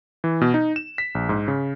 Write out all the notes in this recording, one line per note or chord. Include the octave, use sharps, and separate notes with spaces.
E3
B2
D#4
E7
B6
A#1
G#2
C#3